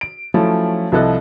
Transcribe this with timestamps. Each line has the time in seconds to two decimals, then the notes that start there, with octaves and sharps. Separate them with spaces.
0.01 D7
0.34 F3 F#3 A3 C#4 E4
0.92 C2 F3 E4 A4 D#5 F#6